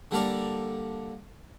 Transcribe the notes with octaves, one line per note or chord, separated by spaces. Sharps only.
D3 G3 A#3 A4 A#4 D5